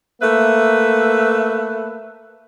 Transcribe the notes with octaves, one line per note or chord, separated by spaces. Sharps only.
A3 A#3 B4 E5